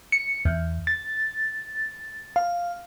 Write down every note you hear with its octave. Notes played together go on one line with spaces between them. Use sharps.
C#7
E2
A6
F5